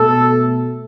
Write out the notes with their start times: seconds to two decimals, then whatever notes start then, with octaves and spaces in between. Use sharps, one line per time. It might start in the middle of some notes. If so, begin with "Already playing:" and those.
Already playing: B2 A3 A4